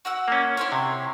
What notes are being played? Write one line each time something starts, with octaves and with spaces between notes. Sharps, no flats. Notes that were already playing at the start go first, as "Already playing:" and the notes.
F#4 F#5 E6
A#3 C#4
E4 C5 C#5
C3